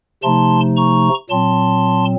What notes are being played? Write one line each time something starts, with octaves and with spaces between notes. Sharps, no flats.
C3 F3 A3 D#4 A5 C6
A#5 C#6
A#2 F#3 C4 A5 C6